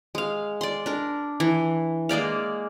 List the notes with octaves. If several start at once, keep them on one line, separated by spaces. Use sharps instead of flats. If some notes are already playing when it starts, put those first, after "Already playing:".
G#3 F5
D5 C6
D4 A#4
E3
G#3 A#3 D5 F5